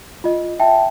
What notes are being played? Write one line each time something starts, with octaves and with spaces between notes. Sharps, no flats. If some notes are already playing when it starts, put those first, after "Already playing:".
F4 D#5
E5 G5 A5